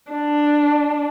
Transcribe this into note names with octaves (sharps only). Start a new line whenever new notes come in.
D4